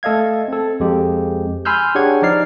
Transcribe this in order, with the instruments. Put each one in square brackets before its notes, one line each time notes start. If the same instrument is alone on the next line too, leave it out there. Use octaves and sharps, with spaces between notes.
[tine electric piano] A3 A4 D#5 F5 G#6
C4 A4
F2 G#3 G4
G#5 B5 C6 E6 F6 G6
D4 G4 G#4 C#5 F#5 G#6
F3 D#4 D5 F6 C7